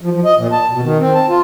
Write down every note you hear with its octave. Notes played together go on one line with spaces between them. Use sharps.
F3
F3
D#5
A#2
A5
B2
D#3
C4
A5
F4